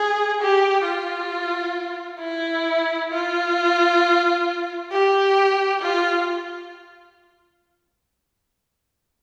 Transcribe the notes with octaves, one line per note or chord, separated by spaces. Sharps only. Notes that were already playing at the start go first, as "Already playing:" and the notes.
Already playing: G#4
G4
F4
E4
F4
G4
F4